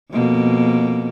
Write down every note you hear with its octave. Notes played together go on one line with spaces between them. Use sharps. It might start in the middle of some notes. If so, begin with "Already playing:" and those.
F2 B2 A#3